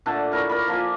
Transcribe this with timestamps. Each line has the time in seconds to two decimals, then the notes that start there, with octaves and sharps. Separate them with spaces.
0.06 A#2 D3 A3 A5
0.32 E4 A#4 C#5
0.49 A#4 D5 B5
0.68 F3 A#3 G#5